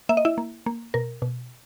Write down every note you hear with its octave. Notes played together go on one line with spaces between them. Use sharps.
A#3 E5
D#5
E4 E5
A#3
A#3
B2 A#4
B2